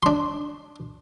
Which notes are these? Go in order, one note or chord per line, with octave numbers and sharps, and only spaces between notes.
D4 C6